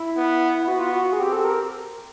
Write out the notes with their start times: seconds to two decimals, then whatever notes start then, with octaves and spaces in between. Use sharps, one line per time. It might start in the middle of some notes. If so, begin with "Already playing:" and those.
Already playing: E4
0.17 B3
0.68 B3 F#4
0.79 F4
0.90 F#4
1.13 G#4
1.20 C4 G4
1.33 A4
1.45 A#4